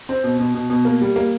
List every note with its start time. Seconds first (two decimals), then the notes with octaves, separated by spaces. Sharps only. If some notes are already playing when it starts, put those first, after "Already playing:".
0.09 C4
0.24 B2
0.39 B2
0.54 B2
0.70 B2
0.85 A#3
1.01 G3
1.16 A#3